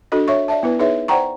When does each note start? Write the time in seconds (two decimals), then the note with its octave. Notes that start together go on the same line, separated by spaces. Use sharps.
0.12 D4 F#4 A4 D#5
0.28 C#5 E5 C#6
0.48 D5 E5 A5
0.63 B3 E4 B4
0.79 D#4 G#4 B4 C#5 E5
1.08 C5 D5 F#5 G5 A#5 C#6